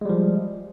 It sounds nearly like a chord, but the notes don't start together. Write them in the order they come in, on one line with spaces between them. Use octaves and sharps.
G#3 G3 F3